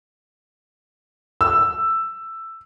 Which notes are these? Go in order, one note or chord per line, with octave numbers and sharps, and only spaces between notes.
E6